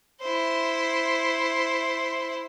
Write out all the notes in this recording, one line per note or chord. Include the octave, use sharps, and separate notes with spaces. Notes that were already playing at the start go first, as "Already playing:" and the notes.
E4 C5